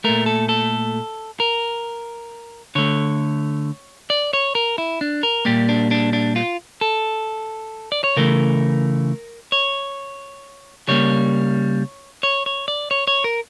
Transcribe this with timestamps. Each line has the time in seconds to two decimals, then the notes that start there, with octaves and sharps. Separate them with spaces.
0.04 A#2 A3 A#4
0.26 A4
0.49 A4
1.40 A#4
2.75 D3 A3 C#5
4.10 D5
4.33 C#5
4.55 A#4
4.78 E4
5.01 D4
5.23 A#4
5.45 A#2 G3 A#3 G4
5.69 D4
5.91 D4
6.13 D4
6.36 F4
6.81 A4
7.92 D5
8.04 C#5
8.17 C#3 E3 A3 A#4
9.52 C#5
10.88 C#3 G3 A#3 C#5
12.23 C#5
12.46 C#5
12.68 D5
12.91 C#5
13.07 C#5
13.24 A#4